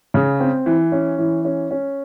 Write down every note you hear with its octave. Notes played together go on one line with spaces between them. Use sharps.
C#3
C4
E3
C#4
E3
C#4
C#4